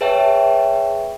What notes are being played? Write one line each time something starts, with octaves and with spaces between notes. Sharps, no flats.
G#4 B4 C#5 E5 G5 A5